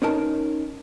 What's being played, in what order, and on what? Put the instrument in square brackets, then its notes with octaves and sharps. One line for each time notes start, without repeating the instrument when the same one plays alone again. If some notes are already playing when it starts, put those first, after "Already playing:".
[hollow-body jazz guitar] C#4 D#4 A#4 A5